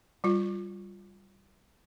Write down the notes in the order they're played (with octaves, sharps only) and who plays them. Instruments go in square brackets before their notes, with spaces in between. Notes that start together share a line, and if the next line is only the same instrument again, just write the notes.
[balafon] G3 F4